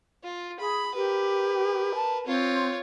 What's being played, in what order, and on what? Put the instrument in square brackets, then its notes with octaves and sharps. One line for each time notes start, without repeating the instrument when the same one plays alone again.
[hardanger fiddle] F4
[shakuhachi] G#4 [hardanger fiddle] B5
[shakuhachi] G4 [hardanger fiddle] A#4 B4
[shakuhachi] A5
[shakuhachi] C4 [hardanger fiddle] F4 C#5